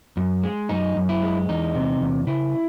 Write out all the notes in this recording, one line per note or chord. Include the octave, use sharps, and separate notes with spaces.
F#2
G#3
F#2 D#4
F#2
E4
G#3
E2 D#4
C3
E2
C#3 E4